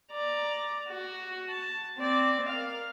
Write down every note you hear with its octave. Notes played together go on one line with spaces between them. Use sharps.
D5 A#5
F#4
A5
C4 D5
A#4 F5